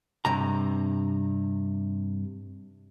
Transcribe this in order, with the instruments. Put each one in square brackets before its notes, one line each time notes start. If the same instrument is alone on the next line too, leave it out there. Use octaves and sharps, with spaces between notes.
[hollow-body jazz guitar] G2 C3 A#5